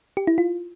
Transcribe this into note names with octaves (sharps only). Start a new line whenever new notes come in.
G4
E4
F4